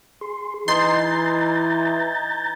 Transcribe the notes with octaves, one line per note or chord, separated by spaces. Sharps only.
G#4 C6
E3 D#4 A#5 C6 G6 A6